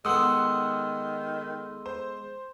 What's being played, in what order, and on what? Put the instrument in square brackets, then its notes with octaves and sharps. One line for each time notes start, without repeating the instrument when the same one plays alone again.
[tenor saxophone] D#3 [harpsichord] G#3 B3 [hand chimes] A4 C6 E6 [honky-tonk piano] F#5 D#6
[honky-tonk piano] C5